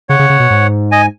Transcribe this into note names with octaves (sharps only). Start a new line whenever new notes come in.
C#3 C#5 F#5
C#3
C#3
B2
G#2
D#5 G#5